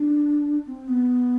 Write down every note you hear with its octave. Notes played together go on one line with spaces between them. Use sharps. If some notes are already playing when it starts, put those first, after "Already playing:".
Already playing: D4
C4
B3